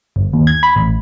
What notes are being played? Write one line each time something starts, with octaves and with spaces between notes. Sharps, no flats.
G1
D#2
G#6
B5
A1